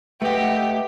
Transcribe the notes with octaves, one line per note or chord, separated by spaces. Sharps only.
A3 G4 B4 D#5 F#5